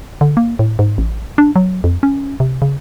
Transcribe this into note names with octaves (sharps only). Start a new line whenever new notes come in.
D3
A#3
A2
G#2
A1
D4
F#3
F2
C#4
C3
C#3